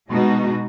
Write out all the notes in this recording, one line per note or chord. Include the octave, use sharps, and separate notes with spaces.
B2 G#3 D#4 F#4